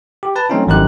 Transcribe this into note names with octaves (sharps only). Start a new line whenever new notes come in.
G4
B4 A5
F#3 A3 C4 C#4 D#4 F4
G#1 F#2 F3 D#4 G4 F#6